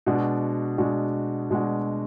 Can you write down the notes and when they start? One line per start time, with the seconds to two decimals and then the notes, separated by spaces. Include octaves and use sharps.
0.06 B2 G#3 D4 F#4
0.78 B2 G#3 D4 F#4
1.50 B2 G#3 D4 F#4